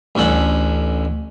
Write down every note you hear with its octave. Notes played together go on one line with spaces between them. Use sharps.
A1 D2 C#4 A4 F#5